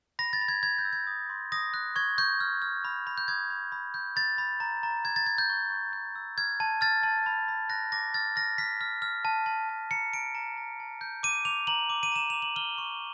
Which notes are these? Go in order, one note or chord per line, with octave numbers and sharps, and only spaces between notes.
B5 A#6
A6
B5
G#6
B5 G#6
G6
E6
G#6
D#6
C6
D#6 A#6
F#6
C#6 G#6
C#6 G6
F6
F6
B5
B5
G6
D#6 G#6
B5
B5
G6
B5 A6
B5
A#5
A#5
A#5 G#6
A6
A#5 G#6
G6
C#6
C#6
G6
E6
F6 G#6
A5
F6 A6
A5
B5
B5
F#6 A#6
D6 A#6
F6 A6
F6 A#6
F6 B6
F6
F6
A5
A5
A5
A#5 C#7
A#5 D7
A#5
A#5
A5
G6
D6 D#7
D6 F7
A#5 F#7
D6
D#7
A#5 E7
D6 F7
F#7
F6 G7
C#6